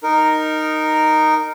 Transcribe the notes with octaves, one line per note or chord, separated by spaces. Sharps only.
D#4 A#4